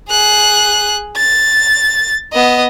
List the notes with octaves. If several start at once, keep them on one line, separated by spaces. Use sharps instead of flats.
G#4 F#6
A6
B3 D#5